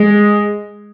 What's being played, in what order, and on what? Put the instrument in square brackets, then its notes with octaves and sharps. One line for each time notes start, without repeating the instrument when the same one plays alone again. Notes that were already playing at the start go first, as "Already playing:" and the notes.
Already playing: [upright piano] G#3